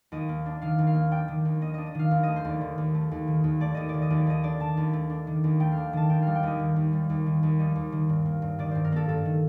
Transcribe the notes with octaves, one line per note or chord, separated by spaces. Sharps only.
D#2 D#5
A#3
D4
D#3 F5
D#2
F5
A#3
D4 G5
D#3
D#2
A#3 D#5
D4 D#5
D#5
D#3 F5
D#2
A3 D#5
C5
D#2 D5
D#3
D#2
A3
D#2
D#3
D#2
A3 D5
D#2 D#5
D#3 D5
D#5
D#2
D5
A3 D#5
D4 D5
D#3 A5
D#2
A3
D4
D#3
D#2
A3 G5
F5
D4
D#3 A5
D#2 G5
G3 F5
G5
D#2 D#5
D#3
D#2
G3
D#2
D#3
D#2
G3 D#5
D#2
D#3
G2
A#3
G2
D#3 D5
G2 C5
A#4
A#3 A4
G2 A4
D#3